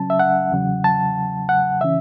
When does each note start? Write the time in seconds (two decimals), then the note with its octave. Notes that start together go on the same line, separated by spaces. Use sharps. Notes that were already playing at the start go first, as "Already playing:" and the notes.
Already playing: C#3 F#3 C#4 A5
0.10 E5
0.19 F#5
0.52 E2 C#3 F#3
0.84 A5
1.49 F#5
1.81 C#3 E3 C#4 E5